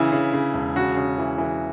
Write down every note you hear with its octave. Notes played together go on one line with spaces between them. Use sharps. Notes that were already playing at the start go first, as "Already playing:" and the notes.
Already playing: C#3 E3 E4
C#3
C#3
E1
C#3 F#4
C#3
E3
E3